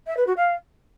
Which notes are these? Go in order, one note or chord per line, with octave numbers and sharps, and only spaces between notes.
E5
B4
F#4
F5